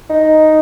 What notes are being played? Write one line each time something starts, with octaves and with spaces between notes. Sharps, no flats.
D#4